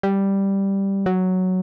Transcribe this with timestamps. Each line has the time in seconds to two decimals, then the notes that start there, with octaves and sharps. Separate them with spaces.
0.03 G3
1.06 F#3